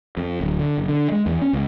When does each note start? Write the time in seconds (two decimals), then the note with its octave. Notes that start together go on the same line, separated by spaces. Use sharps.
0.17 F2
0.41 D1
0.59 D3
0.78 F#1
0.89 D3
1.12 G#3
1.26 E2
1.42 C#4
1.53 C#2